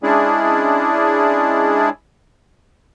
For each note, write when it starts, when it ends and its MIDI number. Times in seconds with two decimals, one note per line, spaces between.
0.03 1.89 56
0.03 1.89 61
0.03 1.89 62
0.03 1.89 64
0.03 1.89 68
0.03 1.89 74